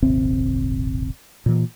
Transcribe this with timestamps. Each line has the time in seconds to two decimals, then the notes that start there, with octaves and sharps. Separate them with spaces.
0.02 D#1 G#1 C3 C4
1.46 A#2 E3